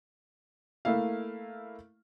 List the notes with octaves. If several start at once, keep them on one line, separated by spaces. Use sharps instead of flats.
A3 A#3 E4 F5